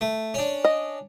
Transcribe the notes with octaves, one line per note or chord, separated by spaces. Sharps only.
A3
C#4 D4
D#5